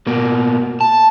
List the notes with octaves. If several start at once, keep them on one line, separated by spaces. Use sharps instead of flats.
B2 A#3
A5